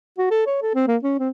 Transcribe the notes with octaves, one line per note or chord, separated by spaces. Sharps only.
F#4
A4
C#5
A4
C4
A#3
C#4
C4